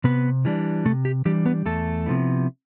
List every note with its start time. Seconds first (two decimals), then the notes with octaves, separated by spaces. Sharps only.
0.04 C3 B3 B4
0.45 E3 G3 D4
0.85 C3 A3 A4
1.05 G4
1.25 E3 G3 D4 G4
1.46 B3 B4
1.66 E2 A3 A4
2.06 C3 F3 B3 E4